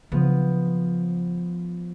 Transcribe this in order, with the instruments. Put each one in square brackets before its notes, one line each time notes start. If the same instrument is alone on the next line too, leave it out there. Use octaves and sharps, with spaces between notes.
[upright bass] C#3 D4 [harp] F3 B3